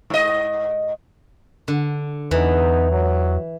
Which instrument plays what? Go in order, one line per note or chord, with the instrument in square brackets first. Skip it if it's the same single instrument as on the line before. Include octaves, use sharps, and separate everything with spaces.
[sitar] G#2 D#5
[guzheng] D3
[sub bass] E2 [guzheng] E3 [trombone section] B3 D#4
[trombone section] F#3